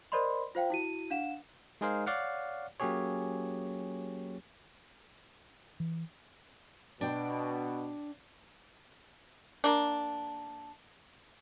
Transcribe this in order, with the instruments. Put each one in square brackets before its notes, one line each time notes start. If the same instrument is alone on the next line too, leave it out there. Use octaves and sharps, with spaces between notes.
[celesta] A#4 C5 D5 D#5 B5 C6
F4 C5 F5 G5
E4 F#4 D#7
D4 F5 F#5 E7
[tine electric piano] G#3 D#4 G#4 A#4 C5 F5
C#5 D5 F5 F#5
F#3 A#3 C#4 G4 G#4 C#5
[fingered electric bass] E3
[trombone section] B2 [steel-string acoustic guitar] D4 G5
[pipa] A#3 D4